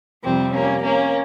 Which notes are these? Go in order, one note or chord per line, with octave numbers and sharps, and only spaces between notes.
F2 C3 G3 C4
A#3 C#4
A#3 C#4